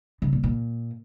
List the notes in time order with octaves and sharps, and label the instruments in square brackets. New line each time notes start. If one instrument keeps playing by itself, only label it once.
[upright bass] C#3
A#2
A#2